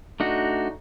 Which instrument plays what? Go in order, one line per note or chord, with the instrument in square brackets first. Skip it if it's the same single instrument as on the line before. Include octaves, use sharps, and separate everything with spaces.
[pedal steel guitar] A3 D4 D#4 F#4